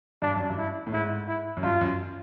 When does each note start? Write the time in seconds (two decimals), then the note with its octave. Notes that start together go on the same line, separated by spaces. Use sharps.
0.22 G2 D4
0.36 F#2
0.50 G2
0.58 E4
0.87 A2
0.93 G#2 E4
1.28 E4
1.57 F#2
1.63 G2 F4
1.81 F#2